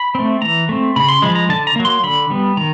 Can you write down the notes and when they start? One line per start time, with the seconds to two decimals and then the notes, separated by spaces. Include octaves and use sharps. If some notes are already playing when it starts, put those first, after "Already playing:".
Already playing: B5
0.15 A3 C4
0.42 E3 A#5
0.69 A3 C4
0.96 C#3 B5
1.09 C6
1.22 F3 G#3 B5
1.35 A#5
1.49 D3 A5
1.67 A#5
1.76 F#3 A#3
1.85 C6
2.03 D3 B5
2.30 G3 B3
2.57 D#3 A#5